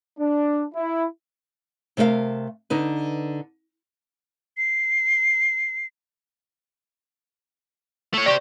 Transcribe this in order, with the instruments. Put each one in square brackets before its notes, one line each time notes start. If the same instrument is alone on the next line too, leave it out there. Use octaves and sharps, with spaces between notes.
[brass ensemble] D4
E4
[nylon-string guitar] C3 A3 A#4 C#5 F5
D3 D#4 B4
[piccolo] C7
[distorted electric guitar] A3 C#5
[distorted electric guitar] G4 C5 [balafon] D5 C#6